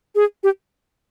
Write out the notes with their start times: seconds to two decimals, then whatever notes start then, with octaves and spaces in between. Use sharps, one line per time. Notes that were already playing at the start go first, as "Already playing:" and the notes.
0.15 G#4
0.43 G4